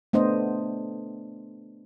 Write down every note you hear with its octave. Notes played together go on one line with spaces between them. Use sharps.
A3 B3 D4 C5 D#5